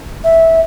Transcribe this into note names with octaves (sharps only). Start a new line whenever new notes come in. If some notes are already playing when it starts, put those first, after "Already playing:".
E5